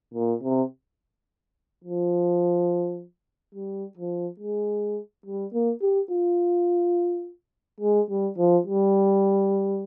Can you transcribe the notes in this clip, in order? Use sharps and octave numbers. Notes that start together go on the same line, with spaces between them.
A#2
C3
F3
G3
F3
G#3
G3
A#3
G4
F4
G#3
G3
F3
G3